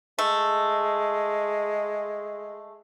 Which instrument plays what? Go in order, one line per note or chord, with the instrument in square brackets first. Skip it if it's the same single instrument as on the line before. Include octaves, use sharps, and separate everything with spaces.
[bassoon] G#3 [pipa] A3